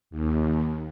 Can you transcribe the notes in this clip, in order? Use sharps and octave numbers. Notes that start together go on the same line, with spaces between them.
D#2